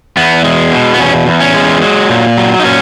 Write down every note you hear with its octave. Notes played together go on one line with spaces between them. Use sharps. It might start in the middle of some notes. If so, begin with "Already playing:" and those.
E2 B3
G#3
B2
B3
E2 C#4
E2
C#4
G#3
F#3
A#2
F#3
D#4
A#2 C#4